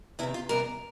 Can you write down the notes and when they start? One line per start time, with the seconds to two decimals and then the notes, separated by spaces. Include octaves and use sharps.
0.19 E2 C3 D#3 E4
0.34 F4
0.49 C3 E3 G3 B3 A#4